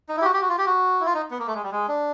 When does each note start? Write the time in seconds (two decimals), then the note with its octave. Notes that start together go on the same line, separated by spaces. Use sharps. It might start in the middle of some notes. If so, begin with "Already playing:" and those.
0.09 D#4
0.17 E4
0.22 G4
0.25 F#4
0.34 G4
0.42 F#4
0.49 F4
0.58 G4
0.66 F#4
1.00 E4
1.06 F4
1.14 D#4
1.31 B3
1.39 A#3
1.47 A3
1.55 G#3
1.63 G3
1.72 G#3
1.88 D4